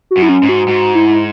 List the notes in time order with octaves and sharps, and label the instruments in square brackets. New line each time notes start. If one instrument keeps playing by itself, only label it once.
[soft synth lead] F#4
[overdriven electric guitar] F#2
[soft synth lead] E4
C#4
[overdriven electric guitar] G#2
[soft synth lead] F#4
[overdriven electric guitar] G#2 [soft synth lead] F#4
[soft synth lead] E4